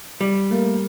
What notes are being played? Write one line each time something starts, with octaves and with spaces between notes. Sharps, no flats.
G3
A3 A#3 A#4